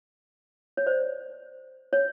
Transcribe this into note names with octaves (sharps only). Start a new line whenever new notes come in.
C#5
C5 D5
C#5